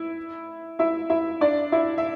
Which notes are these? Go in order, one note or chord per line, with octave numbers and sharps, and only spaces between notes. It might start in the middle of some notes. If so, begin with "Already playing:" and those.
Already playing: E4 E5
E4 E5
E4 E5
D4 D5
E4 E5
E5